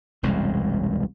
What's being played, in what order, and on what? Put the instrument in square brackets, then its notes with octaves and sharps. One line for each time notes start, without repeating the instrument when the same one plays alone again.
[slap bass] E1 C2 F#2 G#3